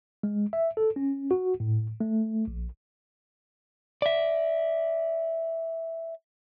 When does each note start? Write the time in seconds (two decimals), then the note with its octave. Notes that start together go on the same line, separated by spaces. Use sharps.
0.23 G#3
0.53 E5
0.77 A4
0.96 C#4
1.31 F#4
1.60 A2
2.00 A3
2.48 A#1
4.02 D5 E5